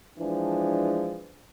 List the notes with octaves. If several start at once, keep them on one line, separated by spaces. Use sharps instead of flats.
E3 F3 G#3 D4